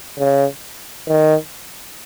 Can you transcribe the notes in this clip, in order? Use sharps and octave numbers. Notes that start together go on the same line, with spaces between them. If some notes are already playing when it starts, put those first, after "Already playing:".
C#3
D#3